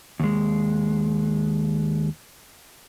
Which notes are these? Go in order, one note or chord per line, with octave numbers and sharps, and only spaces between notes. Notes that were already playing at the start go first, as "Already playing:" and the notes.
D#2 G#3